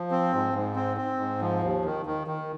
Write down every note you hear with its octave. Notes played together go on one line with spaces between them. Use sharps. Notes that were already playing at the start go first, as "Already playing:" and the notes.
Already playing: F3
C4
G#2
G#2
C4
C4
G#2
F3
D#2
D#3
D#3
D#3